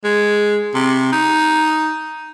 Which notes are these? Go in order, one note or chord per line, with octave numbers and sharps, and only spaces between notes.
G#3
C3
D#4